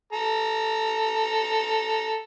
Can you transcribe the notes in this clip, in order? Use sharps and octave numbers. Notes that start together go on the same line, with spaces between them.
A4 A#5